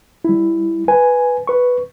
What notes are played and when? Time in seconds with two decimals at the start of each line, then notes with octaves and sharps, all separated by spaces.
0.25 G3 E4
0.88 B4 G#5
1.47 B4 C#6